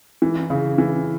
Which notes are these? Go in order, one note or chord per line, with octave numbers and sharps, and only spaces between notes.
E3
C#3
E3